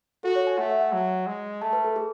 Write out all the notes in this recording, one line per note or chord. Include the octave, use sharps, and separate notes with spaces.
F#4 A4
C#5
G#5
A3 F#5
E5
F#5
F#3
G#3
A3 A5
B4
A4
G#4